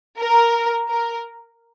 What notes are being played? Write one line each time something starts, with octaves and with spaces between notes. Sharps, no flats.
A#4
A#4